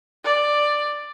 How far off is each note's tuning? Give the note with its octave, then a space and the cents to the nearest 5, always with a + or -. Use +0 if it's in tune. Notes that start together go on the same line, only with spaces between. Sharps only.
D5 +5